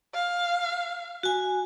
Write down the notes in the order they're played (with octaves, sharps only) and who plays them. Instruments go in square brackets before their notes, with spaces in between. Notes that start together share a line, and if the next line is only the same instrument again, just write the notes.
[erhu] F5
[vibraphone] F#4 G#5